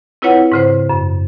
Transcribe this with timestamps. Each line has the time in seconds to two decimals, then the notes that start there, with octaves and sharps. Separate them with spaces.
0.22 C4 E4 F4 B4 C#5 F#5
0.52 G#2 C#3 C5
0.89 F#2